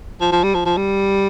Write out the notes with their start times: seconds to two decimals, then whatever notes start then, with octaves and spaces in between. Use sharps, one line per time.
0.21 F3
0.32 F3
0.44 G3
0.55 F3
0.66 F3
0.77 G3